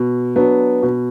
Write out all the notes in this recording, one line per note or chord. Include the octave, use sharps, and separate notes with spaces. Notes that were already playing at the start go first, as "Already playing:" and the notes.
Already playing: B2
F#3 B3 D4
B2